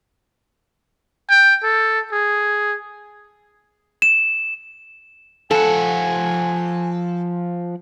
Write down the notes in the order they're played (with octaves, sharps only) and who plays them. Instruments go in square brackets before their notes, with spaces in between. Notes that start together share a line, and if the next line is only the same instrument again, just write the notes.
[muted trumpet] G5
A4
G#4
[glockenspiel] E7
[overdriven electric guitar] F3 F#5 [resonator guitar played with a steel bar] A4 [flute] G#5